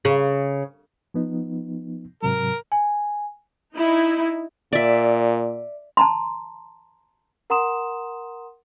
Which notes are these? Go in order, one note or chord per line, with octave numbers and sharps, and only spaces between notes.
C#3
F3 B3 D#4
G#2 C3 F#3 A#4
G#5
D#4 E4
A#2 D5 E5
A5 A#5 C6
A#4 F#5 A#5 C6 D#6 E7